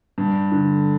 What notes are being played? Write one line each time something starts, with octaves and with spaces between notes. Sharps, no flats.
G2
D3